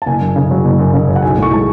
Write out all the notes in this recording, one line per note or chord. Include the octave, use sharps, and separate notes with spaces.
A5
F#1 G#5
F#2
C#3
F#3
F#1
F#2
C#3
F#3
F#5
B1 G#5
A2 C#6
G#3 A5